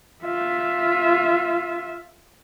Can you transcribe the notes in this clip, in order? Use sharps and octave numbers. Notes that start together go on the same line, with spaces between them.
F4 E5